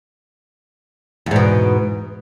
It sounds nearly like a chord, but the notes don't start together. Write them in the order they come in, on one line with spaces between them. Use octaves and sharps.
E2 G#2 B2